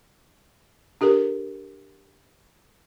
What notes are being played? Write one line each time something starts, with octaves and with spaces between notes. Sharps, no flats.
D4 G4 A4 A#4